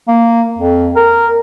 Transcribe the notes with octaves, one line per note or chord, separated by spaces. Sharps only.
A#3
F2
A#4